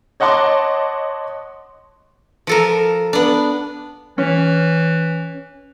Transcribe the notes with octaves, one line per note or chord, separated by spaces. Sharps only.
C#5 D#5 F#5 A5 C6 D6
F3 A4 A#4
B3 D4
E3 C#4